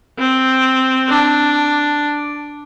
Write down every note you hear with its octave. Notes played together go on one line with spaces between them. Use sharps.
C4
D4